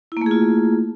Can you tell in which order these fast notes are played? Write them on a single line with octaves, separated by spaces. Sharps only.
E4 A#3 A3 G#4 F4